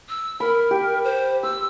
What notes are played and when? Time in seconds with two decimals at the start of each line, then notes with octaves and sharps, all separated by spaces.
0.09 E6
0.40 A#4 B5
0.71 G4
1.04 C5
1.43 C6 E6